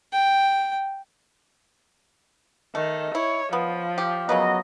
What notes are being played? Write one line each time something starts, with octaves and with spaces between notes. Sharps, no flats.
G5
D#3 A3
E4 C#5
F3 B3
G4
C#3 F#3 A#3 B3 B4 D#5